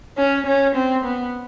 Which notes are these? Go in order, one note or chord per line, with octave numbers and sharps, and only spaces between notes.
C#4
C#4
C4
B3